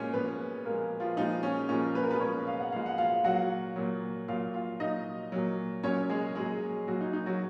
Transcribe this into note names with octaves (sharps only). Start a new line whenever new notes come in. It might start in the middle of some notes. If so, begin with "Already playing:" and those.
Already playing: A#2 F3 G#3 C#4 C#5
A#2 F3 G#3 B3 B4
A#2 F3 G#3 A#3 A#4
F3 F4
A#2 F3 G#3 D#4
C#4
A#2 F3 G#3 C#4
B4
A#4
B3 B4
A#2 F3 G#3 C#4 C#5
F5
F#5
A#2 F3 G#3 F5
F#5
F4 F5
A#2 F#3 F#4 F#5
A#2 F#3
A#2 F#3 F4 F5
F4 F5
A#2 F#3 D#4 D#5
A#2 F#3
A#2 F#3 C#4 C#5
G#3 G#4
A#2 F#3 G#3 G#4
A#2 F#3 F#4
D#4
D#4
F#3 F#4